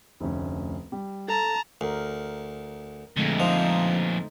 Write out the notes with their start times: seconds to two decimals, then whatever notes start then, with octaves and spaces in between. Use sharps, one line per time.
0.20 F1 D2 C#4
0.92 G3
1.28 A4 A5 A#5
1.81 D2 A#4
3.17 F2 A#2 D3 G#3 A3
3.40 F3 D#4 C5 D#5